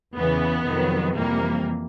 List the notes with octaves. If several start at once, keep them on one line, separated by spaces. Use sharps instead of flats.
E2 C#3 E3 B3
F2 C3 D#3 F#3
F2 C3 E3 G3 A#3